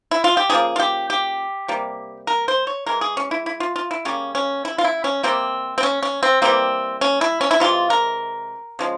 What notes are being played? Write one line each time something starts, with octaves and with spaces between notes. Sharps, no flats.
E4
F4
G4
C#3 F3 A#3 G#4
F4
G4
G4
C3 G3 A#3
A#4
C5
C#5
E3 G#3 A#4
G#4
C#4
E4
E4
F4
F4
E4
C#3 G3 A#3 C#4
C#4
E4
F4
E4
C#4
C3 G3 A#3 C4
C4
C#4
C#4
C4
E3 G3 A#3 C4
C#4
E4
C#4
E4
C3 E3 G#3 F4
A#4
C#3 F3 G#3